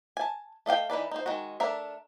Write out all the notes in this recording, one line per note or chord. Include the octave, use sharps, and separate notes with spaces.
G#5 A5
A3 D#5 F5 G5
E3 D#4 B4 D5
D#4 C5
D#3 G#3 F#4
A3 D4 A#4 E5